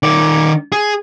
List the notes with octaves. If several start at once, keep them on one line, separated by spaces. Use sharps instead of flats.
D#3 D5
G#4